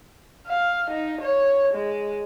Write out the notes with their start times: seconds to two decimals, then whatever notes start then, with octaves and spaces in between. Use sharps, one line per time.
0.47 F5
0.90 D#4
1.21 C#5
1.73 G#3